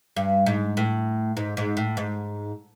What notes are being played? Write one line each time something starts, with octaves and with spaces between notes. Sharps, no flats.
G2
G#2
A2
G#2
G#2
A2
G#2